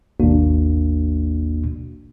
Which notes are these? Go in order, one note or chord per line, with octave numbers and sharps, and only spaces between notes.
G#1 D#2 B2 A#3 D4 F#4